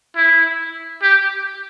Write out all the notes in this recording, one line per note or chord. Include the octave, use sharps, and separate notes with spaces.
E4
G4